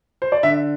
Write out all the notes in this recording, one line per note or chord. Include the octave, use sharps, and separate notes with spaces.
C5
D5
D3 E5